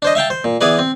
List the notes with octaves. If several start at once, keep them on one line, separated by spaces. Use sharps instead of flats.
D4 C5 D#5
E5 F5 G5 A5
C5
A#2
E3 B3 G#4 B4 D5
C4